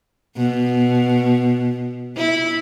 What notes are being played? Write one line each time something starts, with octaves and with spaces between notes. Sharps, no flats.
B2
E4